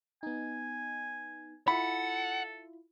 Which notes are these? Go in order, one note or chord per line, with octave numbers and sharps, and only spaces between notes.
B3 D#4 G#5
E4 F4 A4 F#5 B5